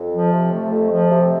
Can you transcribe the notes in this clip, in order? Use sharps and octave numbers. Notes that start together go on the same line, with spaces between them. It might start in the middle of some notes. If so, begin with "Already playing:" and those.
Already playing: F2
F3
C3
A3
F2
F3
C3